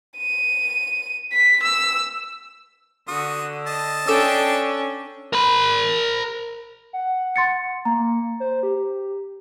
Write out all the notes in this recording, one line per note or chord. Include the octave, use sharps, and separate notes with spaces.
D#7
B6
E6
D3 F#4 D#6
D#5 A5
C#4 D4 A4 G5 D6 E6
A#4 B5
F#5
C6 A6 C#7
A#3 A#5
C5
G4